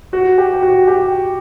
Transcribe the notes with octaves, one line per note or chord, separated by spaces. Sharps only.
F#4
G4
G4
F#4
G4